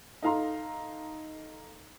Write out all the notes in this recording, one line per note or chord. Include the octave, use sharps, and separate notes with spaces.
D#4 A4 F5 A#5 C6